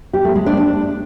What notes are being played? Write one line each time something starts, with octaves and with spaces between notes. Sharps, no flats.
G4
A3
G#3
D4
D4